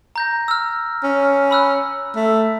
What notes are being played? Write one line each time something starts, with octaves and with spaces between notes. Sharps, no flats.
A#5 G6 A#6
E6 F6
C#4
B5 E6 F#6
A3